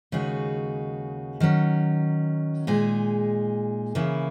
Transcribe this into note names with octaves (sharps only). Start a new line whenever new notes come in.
D#2 C#3 G#3 D#4 F#4
D#3 F#3 C#4
A#2 G#3 D#4 G#4
C#3 E3 A#3 E4